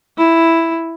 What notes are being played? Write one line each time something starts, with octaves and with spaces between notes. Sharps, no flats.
E4